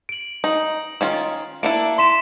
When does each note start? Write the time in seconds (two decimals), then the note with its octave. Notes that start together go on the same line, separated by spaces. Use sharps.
0.09 D7 F#7
0.44 D#4 F#7
1.01 D#3 C#4 F4
1.63 A#3 D4 E4 C#7 D7
1.98 C6 B6 E7